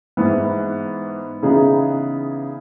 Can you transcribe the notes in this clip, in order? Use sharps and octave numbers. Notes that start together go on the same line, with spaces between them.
G#2 E3 B3
C#3 E3 B3 D#4 G#4